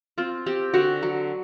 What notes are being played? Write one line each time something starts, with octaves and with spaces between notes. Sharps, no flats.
C4 F4
C4 G4
D3 F#4
F#3